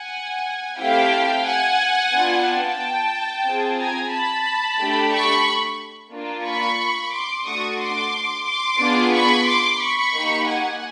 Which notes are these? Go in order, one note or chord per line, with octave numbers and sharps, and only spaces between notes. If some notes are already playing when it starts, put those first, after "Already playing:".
Already playing: F#5 G#5
A3 C4 E4 G4 F5 G5
F#5 G#5
B3 D4 F4
G5 A5
C4 F4 G#4
G#5 A#5
A5 B5
A3 D4 G4
B5 C#6
A#3 D4 F4
B5 C#6
C6 D6
A3 D4 F#4 C#6 D#6
C6 D6
C6 D6
B3 D4 F4 G#4
B5 C#6
C6 D6
B5 C#6
A#3 D#4 G4
F#5 G#5